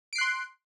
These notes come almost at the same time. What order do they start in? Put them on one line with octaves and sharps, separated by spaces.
D7 C7 F#6 C6